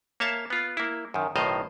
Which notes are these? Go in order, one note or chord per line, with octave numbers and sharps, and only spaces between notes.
A#3 C#5 E5 F5 A5
B3 F4
A#3 E4
F#2 D#3
B1 A2 D#3 C5 D#5 F5